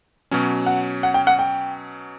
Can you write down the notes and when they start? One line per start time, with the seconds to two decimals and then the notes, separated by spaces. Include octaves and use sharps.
0.31 B2 F#3 C#4
0.66 F#5
1.03 F#5
1.14 G5
1.27 F#5
1.39 G5